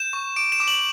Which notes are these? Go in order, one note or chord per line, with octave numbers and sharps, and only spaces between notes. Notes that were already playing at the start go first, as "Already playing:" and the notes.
Already playing: G6 E7
C#6
D6 D7
E7
D6
F#7